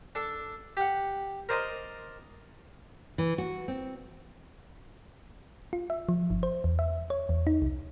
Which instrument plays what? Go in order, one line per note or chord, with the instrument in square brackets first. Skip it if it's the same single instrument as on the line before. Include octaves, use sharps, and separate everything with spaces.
[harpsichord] D4 A4
G4 F#5
A#4 C5 D5 D#5 A#5 C6
[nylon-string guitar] E3
F#4
C4
[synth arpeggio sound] F4
E5
F3
G1
C5
E2
E5
C#5
E2
D#4
C2